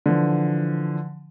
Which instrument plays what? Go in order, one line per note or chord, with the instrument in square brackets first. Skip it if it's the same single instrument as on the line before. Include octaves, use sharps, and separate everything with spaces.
[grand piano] D3 E3 F3